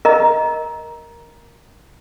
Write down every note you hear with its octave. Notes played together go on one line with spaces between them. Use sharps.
A#4 D#5 A#5